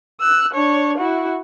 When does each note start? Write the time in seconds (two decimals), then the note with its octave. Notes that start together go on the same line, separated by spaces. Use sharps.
0.21 E6 F#6
0.53 D4 C#5
0.98 E4 F#4